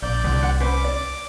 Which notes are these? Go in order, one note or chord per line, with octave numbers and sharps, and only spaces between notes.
A#1 D5 G6
C2 D3
F#5
C#4 B4 C5 D6
D5